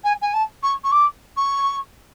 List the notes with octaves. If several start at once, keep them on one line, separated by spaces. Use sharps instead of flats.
G#5
G#5
A5
C#6
C#6
D6
C#6